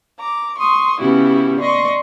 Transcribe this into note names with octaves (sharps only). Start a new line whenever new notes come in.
A#5 D6
C6 C#6 D#6
C#3 B3 C#4 E4 F#4 G4
D5 D#5 C6 C#6